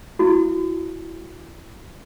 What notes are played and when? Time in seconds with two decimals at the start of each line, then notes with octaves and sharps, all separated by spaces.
0.19 E4 F#4